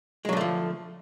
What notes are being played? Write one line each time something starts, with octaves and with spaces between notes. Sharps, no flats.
D3 F3 F#3 G#3 A3